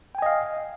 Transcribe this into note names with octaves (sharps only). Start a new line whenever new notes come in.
D#5 F5 G5 G#5